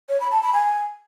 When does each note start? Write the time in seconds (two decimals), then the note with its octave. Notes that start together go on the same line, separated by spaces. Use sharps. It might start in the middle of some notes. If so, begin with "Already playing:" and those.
0.09 C#5
0.20 B5
0.31 A5
0.42 B5
0.53 G#5